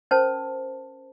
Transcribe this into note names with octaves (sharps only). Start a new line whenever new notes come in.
C#4 A#4 C5 A5